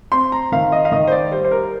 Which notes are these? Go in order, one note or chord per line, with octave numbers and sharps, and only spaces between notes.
C4 C6
A#5
D#3 F5
D#5
F5
D#3 D#5
C5
D5
G3 C5
C5
A#4